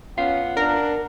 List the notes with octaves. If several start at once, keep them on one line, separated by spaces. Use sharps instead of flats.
B3 C#4 F4 F5 F#5
D4 A#4